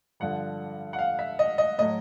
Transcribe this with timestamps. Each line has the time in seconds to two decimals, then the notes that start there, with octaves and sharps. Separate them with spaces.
0.20 G2 D3 F3 F#5
0.93 F#5
0.99 F5
1.19 E5
1.39 D#5
1.58 D#5
1.78 A2 F#3 D#5